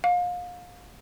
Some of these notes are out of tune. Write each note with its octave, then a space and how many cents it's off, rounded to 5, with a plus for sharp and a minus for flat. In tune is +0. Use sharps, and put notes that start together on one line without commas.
F5 +30